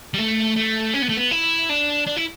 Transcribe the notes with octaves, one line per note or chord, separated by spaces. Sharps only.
G3
A3
A3
C#4
B3
A3
B3
E4
D4
D4
E4